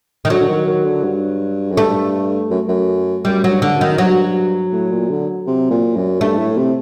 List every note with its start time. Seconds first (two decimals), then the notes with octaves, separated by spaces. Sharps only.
0.25 D#3
0.30 D3 F#3
0.41 D3
0.48 D#3
0.67 D#3
0.85 D3
1.04 G2
1.72 F#2
1.77 G2 A3
2.51 F#2
2.68 F#2
3.25 F#2 G3
3.44 F#3
3.50 G2
3.62 D3
3.75 F#2
3.81 D#3
3.98 G2 F#3
4.73 A2
4.92 A#2
5.10 D3
5.47 C3
5.71 A#2
5.96 F#2
6.21 G2 A3
6.39 A2
6.57 C3